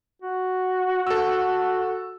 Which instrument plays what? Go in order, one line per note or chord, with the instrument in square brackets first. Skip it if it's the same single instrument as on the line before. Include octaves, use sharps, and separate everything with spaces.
[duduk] F#4
[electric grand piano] A4 E6